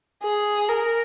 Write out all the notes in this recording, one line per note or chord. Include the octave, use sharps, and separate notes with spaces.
G#4
A#4